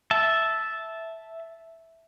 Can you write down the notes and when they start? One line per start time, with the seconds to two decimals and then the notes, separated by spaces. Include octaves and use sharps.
0.11 E5 A5